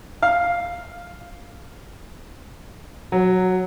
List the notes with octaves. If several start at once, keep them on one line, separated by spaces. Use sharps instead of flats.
F5
F#3